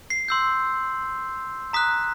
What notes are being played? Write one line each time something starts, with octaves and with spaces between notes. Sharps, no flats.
C7
C6 E6 G6
A#5 D#6 F#6 B6